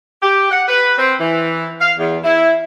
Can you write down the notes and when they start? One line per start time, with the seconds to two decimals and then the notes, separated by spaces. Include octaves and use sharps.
0.22 G4
0.51 F#5
0.68 B4
0.98 C4
1.20 E3
1.80 F5
1.98 E2
2.24 E4